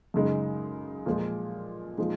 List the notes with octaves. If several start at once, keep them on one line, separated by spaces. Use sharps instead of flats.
F#2 C#3 G#3 D#4
A#2 F3 G#3
A#2 F3 G#3 D#4